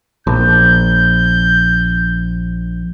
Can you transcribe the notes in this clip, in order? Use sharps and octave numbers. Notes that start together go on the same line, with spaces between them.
A#1 G6